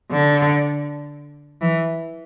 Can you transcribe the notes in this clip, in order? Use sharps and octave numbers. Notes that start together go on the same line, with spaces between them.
D3
E3